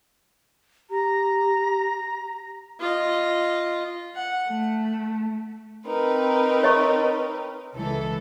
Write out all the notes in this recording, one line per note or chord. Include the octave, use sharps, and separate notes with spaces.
G4 A#5
F4 D#5
F#5
A3
C4 D#4 A#4 B4
C#5 D#5 C#6
C#2 E3 A4